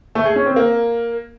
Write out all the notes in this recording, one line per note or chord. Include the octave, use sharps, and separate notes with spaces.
A3
G#4
C#4
C4
A#3